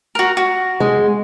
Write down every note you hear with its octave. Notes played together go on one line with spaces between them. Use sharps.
F#4 A#4
F#4
G#3